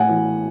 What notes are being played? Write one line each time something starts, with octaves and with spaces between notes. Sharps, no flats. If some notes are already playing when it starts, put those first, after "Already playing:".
Already playing: A2 F#5 G#5
E3